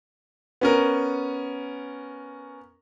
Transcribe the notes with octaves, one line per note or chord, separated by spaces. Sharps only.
B3 C#4 A#4